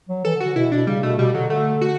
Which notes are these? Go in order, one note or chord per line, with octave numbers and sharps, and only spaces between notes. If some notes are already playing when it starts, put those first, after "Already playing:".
F#3
E3 A4
D3
F#4
D3
B2 E4
B2 D4
C#3 G3
B2 A3
B2 G3
D3 F#3
D3 A3
F#4